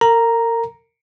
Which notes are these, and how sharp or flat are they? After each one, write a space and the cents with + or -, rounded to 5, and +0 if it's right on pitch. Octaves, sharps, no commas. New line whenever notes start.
A#4 -30 A#5 +0